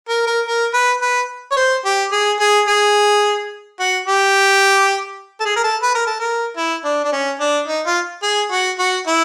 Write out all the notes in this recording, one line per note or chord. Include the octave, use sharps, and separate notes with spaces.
A#4
A#4
A#4
B4
B4
C#5
C5
G4
G#4
G#4
G#4
F#4
G4
A4
G#4
A#4
A4
B4
A#4
A4
A#4
E4
D4
D4
C#4
D4
D#4
F4
G#4
F#4
F#4
E4